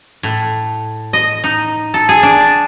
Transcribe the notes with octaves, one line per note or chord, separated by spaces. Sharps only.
A2
D#5
D#4
A4
G#4
D4